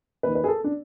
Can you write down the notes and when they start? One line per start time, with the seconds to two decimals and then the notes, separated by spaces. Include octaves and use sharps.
0.23 D#2 D#3 B4
0.35 B4
0.44 G#4
0.48 A4
0.64 D4